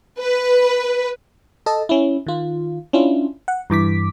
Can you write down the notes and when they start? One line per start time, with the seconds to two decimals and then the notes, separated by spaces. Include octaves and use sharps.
0.20 B4
1.66 A4 D#5 A5
1.89 C#4 E4
2.27 D#3 F4
2.93 C#4 D4 E4 F4
3.48 F#5
3.70 G2 E3 D6 B6